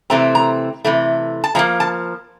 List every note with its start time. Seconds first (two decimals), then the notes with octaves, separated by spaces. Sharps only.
0.10 C3 E3 A3 C4 A#5
0.35 A#5
0.85 C3 E3 A3
1.44 A5
1.55 A#2 F3 A#3 A#5
1.80 A5